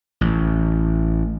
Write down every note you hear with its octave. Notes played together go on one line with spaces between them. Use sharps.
A1